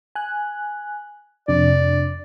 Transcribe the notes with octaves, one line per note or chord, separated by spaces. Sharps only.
G#5 F#6
F2 C3 D4 D5